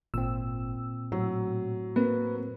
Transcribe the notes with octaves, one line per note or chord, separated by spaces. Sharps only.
G#1 A#2 C4 E6
A2 F#3
A#3 C4 B4